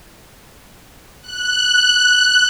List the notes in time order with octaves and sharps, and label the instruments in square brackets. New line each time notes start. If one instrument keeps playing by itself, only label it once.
[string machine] F#6